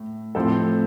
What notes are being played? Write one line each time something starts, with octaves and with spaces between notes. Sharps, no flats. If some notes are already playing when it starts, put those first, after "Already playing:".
Already playing: A2
A2 F3 C4 A4